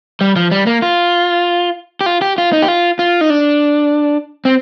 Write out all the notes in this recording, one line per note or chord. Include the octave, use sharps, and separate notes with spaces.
G3
F3
G3
A#3
F4
G4
F4
G4
F4
D#4
G4
F4
F4
D#4
D4
C4